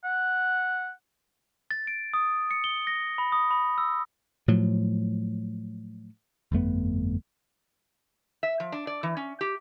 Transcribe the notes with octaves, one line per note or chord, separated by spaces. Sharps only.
F#5
A6
D7
D#6
C#7
G7
A#6
B5
D#6
B5
E6
A2 F3 F#3
G1 F2 A3 B3
E5
F3
D4
D5
E3
C#4
G4